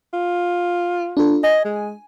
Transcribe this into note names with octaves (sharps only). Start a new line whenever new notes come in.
F4
D4 F4 A4
D#5 G#5
G#3